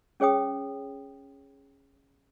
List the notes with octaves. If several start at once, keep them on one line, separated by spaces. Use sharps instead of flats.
C#4 G#4 C#5 G5 D#6